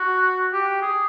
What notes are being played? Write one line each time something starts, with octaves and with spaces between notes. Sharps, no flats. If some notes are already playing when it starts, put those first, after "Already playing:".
Already playing: F#4
G4
G#4